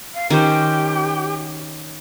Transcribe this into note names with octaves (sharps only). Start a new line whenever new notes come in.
F5
D#3 C#4 G4 C5